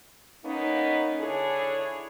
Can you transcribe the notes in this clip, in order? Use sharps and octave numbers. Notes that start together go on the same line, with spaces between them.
A#3 B3 C#4 D#4
D3 D4 E4 G#4 A4 C#5